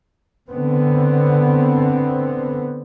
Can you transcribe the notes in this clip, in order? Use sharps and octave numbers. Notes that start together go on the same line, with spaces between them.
D3 B3 C4